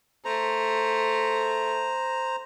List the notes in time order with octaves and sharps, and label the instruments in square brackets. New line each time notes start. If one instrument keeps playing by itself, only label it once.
[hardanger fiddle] A3 [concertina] C5 A#5